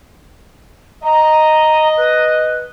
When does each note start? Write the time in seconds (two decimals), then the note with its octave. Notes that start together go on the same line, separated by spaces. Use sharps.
1.04 D#5 A#5
1.97 B4